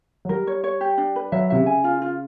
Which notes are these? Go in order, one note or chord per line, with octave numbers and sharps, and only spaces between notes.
F#3
G3 A#4
C#5
C#5
G4
D4
B4
F#3 E5
C3 E5
C#3
G#5
F4
F4